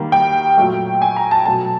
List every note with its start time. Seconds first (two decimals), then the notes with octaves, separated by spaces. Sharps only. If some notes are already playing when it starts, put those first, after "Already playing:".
Already playing: D#3 G3 A#3
0.12 G5
0.58 A#2 F#3 A3
1.02 G#5
1.16 A#5
1.31 A5
1.46 B2 F#3 A3 A5